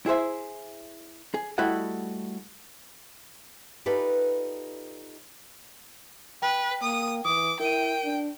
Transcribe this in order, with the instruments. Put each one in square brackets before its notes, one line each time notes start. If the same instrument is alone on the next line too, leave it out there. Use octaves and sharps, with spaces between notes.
[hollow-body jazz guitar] E4 G#4 C5 E5
G#4
G3 A3 E4 F#4 D#5 F#5
[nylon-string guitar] D#4 F4 G4 A4 B4 D5
[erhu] B4 [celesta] G5
[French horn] A#3 [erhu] D#6
[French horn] E3 [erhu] D6 [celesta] D#6
[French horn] E4 [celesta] A#4 D#7 [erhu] G5
[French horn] D4